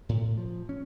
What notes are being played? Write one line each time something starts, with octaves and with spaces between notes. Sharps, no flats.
A2
F3
C#4